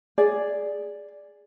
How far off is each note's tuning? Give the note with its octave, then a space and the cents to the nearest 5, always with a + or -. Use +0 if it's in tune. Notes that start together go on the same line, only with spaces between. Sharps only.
G#4 +0 D5 +0